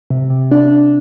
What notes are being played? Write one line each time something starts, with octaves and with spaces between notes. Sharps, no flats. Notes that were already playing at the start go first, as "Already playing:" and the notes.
C3
C3
D4
D4